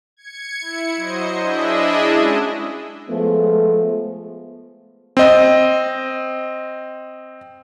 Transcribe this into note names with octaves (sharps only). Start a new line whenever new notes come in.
G#6 C#7
E4 C#7
F#3 C5 D#5
D4 E4 G#4 D#5 E5
G#3 C#4 F#4
F3 G#3 A3 B3
C4 D#5